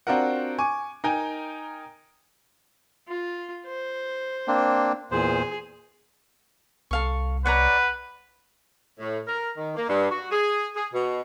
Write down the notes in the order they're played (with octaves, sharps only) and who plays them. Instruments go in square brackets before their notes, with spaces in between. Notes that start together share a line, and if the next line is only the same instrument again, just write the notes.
[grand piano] C4 D4 F4 F#4 A#4 F#5
G#5 C#6 D6
D#4 A#4 G5 G#5 A#5
[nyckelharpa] F4
C5
[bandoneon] A#3 C4 D4
[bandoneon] E2 A#2 C5 [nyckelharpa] G#4
[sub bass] C2 [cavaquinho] A4 F5 C#6
[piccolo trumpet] B4 [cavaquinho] C#5 D5 A#5 [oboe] F#5
[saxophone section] A2
A#4
D#3
A#3
G2
F#4
G#4
G#4
B2